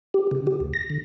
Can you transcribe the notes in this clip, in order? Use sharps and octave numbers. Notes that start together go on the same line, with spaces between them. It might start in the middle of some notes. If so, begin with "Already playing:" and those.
G4
C#3
G4
D2
A#6
D3